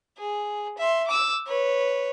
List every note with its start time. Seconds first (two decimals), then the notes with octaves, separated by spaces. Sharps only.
0.18 G#4
0.78 E5 C6
1.07 D6 E6
1.47 B4 C#5